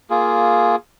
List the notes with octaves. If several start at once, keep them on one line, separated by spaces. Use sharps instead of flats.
A#3 F4 G#4